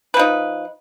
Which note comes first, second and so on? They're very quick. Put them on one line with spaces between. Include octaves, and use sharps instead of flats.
B4 F3 D#4